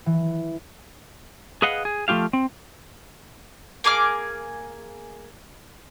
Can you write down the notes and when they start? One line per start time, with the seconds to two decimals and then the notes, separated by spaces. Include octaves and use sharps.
0.06 E3
1.62 G#4 B4 D#5 F5 F#5
1.85 G#4
2.08 F3 A3 F4 G4 F5
2.33 C4
3.84 A#3 G#4 D6 F6